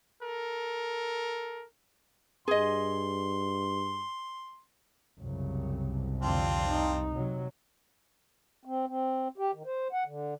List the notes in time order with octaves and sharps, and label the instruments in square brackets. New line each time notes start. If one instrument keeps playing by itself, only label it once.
[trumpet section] A4 A#4
[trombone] G2 [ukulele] G#4 D#5 [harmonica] C6
[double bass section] C2 [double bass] F#2 C#3
[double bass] F2 D3 [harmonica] C4 D4 F4
[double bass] D#4
[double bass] C3 [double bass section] F#3
[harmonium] C4
C4
G4
D#3
C5
F#5
D3